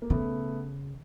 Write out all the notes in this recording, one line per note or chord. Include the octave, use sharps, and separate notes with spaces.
A#3
C#3 A3 B3